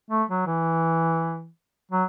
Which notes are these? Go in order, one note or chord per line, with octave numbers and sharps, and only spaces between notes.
A3
F#3
E3
F#3